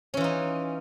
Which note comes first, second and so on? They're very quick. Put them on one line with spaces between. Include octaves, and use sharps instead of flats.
C#4 E3 F4 D#4